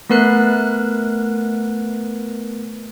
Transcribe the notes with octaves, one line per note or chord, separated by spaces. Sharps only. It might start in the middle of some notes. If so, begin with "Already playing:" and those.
A3 B3 A#4 B4 F#6